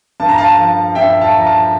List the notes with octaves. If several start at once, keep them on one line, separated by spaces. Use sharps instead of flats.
G2 A5
A#5
F5 A5
F3
G2 E5 G5
F5 A5
F3
A#5
F5 A5